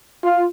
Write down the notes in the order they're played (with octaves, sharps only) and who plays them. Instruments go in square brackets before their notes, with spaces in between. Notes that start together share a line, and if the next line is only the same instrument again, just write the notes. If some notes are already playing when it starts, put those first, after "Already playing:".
[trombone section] F4